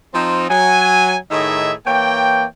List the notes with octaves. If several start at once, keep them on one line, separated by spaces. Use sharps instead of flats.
F3 C4 D#4
F#3 G#5
A2 D#3 D#4 G#4 D#5 E5
E3 A#3 C#5 G5